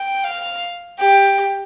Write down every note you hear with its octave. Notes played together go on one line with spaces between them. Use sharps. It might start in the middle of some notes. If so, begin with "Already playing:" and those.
Already playing: G5
F5
G4